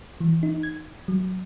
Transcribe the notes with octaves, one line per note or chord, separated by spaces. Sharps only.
E3
D#4
G#6
F#3